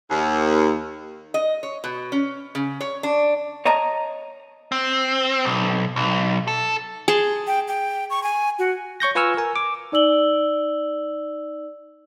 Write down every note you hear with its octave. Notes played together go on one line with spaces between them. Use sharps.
D#2
D#5
C#5
B2
C#4
C#3
C#5
D4
C#5 D#5 A5 A#5
C4
B1
B1
A4
G#4 A5 C6
G5
G5
C#6
G#5
F#4
C#5 C#6 G6 A#6
F4 B4 G#5 C#6 E6 F6
A#4 G#5
D6
D#4 D5 E6 F#7 G7